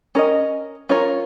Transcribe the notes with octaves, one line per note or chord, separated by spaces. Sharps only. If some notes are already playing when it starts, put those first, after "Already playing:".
C#4 A#4 D#5
C#4 F4 A#4 C#5